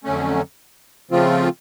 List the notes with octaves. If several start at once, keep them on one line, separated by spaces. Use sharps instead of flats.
F2 D3 F#3 A3 C#4
C#3 F3 A3 C4 F4